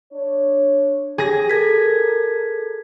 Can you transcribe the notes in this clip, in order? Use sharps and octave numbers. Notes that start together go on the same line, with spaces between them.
D4 C#5
G4 G#4 A#6
A4 A#4 G#6 B6